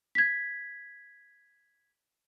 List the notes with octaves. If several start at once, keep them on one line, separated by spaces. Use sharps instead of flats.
G#6 B6